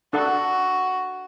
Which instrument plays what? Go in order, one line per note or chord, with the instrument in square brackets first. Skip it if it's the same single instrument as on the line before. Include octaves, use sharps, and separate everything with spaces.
[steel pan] D4 A4 F#5 [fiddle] F#4